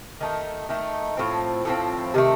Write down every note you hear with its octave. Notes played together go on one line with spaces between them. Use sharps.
D#3 A3 D#4
D#3 A3 D#4
A2 F3 C4
A2 F3 C4
C3 D#3 A3